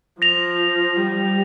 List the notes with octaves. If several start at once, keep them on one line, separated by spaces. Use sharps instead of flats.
F3 A#6 F7
G3